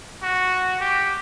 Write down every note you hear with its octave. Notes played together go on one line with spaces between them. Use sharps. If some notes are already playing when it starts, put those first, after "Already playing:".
F#4
G4